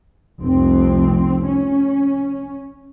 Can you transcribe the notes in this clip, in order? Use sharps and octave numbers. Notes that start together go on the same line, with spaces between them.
F1 C2 F2 C4
C#4